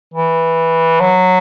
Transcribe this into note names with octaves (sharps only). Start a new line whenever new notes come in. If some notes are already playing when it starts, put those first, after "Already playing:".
E3
F#3